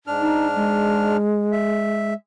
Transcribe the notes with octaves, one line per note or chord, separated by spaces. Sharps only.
G#2 D4 F6
D#4
G#3
E5